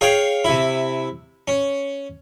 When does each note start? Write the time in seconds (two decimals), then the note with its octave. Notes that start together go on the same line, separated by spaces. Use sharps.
0.01 G#4 C#5 F5 G5
0.45 C3 E4
1.48 C#4